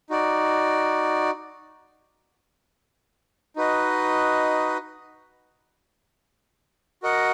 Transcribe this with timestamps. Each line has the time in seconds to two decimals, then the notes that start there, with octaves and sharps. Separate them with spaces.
0.10 D#4 F#4 D5
3.56 D#4 F#4 B4 D#5
7.03 F#4 A#4 D#5 F#5